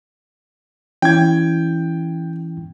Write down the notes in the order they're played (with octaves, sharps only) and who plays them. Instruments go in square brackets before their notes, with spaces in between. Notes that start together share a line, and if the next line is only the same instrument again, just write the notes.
[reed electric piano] E3 C#4 E4 [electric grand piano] G5 G#6